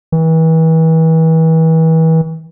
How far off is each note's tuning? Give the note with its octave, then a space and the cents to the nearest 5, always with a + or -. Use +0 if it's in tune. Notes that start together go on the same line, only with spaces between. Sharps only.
E3 -35